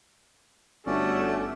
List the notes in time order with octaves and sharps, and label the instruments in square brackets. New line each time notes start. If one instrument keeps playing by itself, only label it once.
[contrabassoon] G1 [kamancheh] A3 [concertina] C#4 F#4 D5